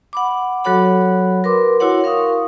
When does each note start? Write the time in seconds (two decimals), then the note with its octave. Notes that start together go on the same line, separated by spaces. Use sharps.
0.13 F#5 B5 D6
0.64 F#3 F#4 A4 C#5 F#5 B5
1.44 A#4 B4 C6 D6
1.80 E4 F#4 C#5 F#5 C6
2.04 A#4 F5 C#6 D#6